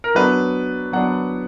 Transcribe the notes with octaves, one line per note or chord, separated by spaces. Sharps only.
A#4
F#3 B3 D4 B4
F#3 B3 D4 F#5